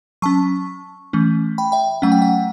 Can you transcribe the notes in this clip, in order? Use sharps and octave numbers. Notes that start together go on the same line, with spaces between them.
F#3 C#4 A5 C#6
E3 A3 C#4
G5 B5
E5 G5
F#3 A3 C#4 F#5
G5
F#5